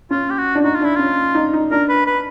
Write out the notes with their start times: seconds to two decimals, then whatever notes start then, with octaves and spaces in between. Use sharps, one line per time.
0.11 C#4 F4
0.30 G4
0.38 F#4
0.55 D4
0.64 D#4 F#4
0.75 F4
0.81 D4 E4
0.96 C#4 F4
1.35 D#4
1.53 D#4
1.71 D4 A#4
1.89 B4
2.06 B4